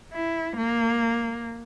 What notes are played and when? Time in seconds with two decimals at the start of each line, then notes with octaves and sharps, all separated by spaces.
0.13 E4
0.57 A#3